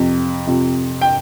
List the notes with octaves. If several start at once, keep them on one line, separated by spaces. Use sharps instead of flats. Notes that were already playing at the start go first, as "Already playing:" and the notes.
Already playing: F2 C3 F3
F2 C3 F3
G5